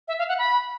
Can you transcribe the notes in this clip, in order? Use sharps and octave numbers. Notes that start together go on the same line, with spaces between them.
E5
F5
F#5
B5